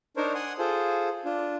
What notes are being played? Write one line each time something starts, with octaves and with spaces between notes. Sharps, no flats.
D4 D#4 A#4 C5 C#5
F#5 G#5 C6 D#6
F4 G#4 A4 C5
D4 F4